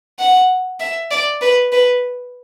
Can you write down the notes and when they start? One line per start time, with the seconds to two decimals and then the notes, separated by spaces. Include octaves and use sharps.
0.19 F#5
0.80 E5
1.11 D5
1.42 B4
1.73 B4